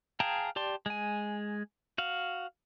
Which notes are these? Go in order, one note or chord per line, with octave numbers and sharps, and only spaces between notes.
G#4 F5 G5 A5 A#5
G4 D5 A5 C6
G#3 G#5
F#4 F5